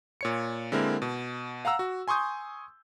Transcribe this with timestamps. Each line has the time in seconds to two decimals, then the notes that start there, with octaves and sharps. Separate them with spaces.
0.21 A#2 C#5 C#7
0.72 D3 G#3 A#3 C4 E4 A#4
1.02 B2
1.65 F5 F#5 A#5 E6
1.79 F#4
2.08 G#5 C6 C#6 D#6 G6